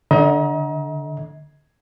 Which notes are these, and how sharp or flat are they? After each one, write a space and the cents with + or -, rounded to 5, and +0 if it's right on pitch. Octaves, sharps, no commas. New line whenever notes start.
D3 +0 D#5 +40 A#5 +30